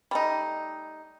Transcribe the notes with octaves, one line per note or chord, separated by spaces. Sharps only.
G3 A3 D#4